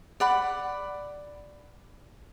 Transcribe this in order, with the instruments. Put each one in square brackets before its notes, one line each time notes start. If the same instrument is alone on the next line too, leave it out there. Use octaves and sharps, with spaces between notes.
[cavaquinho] D5 F#5 B5